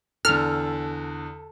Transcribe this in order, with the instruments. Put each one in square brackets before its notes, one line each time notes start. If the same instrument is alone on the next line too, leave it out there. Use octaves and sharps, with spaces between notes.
[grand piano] E2 D3 [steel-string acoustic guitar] A4 [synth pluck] F6